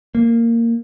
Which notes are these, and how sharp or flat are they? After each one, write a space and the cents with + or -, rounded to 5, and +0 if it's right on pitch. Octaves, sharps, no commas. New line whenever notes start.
A#3 -10